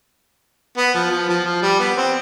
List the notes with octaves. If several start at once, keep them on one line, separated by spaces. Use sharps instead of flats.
B3
F3
F3
F3
F3
G3
B3
C4